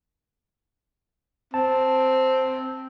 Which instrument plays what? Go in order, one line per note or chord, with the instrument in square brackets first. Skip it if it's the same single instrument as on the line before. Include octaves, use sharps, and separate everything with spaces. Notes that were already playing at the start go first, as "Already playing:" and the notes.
[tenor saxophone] C4 [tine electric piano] A5